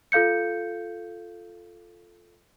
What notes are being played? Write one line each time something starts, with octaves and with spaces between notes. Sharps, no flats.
F4 A4 F5 G6 C#7